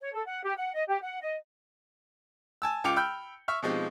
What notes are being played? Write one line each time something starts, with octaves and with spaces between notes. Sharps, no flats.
C#5
A4
F#5
G4
F#5
D#5
G4
F#5
D#5
G#5 A5 E6
C#2 F4 G5 D6 C#7 F7
G5 B5 E6 F6 G6
E5 C#6 F6
B2 F3 G#3 C4 D#4 G4